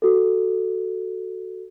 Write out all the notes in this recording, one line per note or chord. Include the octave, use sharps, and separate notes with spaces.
F#4 A4